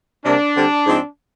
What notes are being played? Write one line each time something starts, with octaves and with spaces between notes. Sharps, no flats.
C3 G3 A#3 D4
D3 G3 C4
G#2 F3 G#3 C4